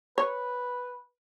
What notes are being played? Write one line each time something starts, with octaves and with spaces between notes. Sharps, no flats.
B4 C#5